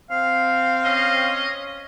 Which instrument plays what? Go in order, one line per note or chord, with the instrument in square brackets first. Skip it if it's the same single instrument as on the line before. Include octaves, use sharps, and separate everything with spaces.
[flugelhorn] C4 [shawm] F5
[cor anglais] C#4 [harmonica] D#5